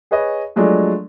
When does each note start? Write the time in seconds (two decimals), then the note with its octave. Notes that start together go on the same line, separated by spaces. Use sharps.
0.11 G#4 B4 C#5 D#5
0.56 F3 F#3 G#3 A3 D4